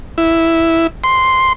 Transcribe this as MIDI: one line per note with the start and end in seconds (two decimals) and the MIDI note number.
0.18 0.87 64
1.04 1.53 84